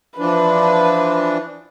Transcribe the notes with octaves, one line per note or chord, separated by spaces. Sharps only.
E3 F3 D4 B4